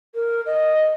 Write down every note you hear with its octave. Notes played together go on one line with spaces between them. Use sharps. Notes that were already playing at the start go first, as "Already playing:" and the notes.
A#4
D#5